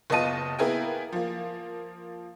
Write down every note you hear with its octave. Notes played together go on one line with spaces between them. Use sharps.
F#1 B3 F4 D#5 A5 D#7
A#3 B3 E4 G#4 A#4 G5
F3 A#3